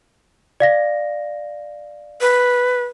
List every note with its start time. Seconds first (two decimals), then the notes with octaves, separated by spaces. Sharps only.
0.60 D5 F5 A#6
2.21 B4